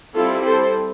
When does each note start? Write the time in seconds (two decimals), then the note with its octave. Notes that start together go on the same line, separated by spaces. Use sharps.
0.14 G3 C4 E4 F4 A4
0.45 A4 C5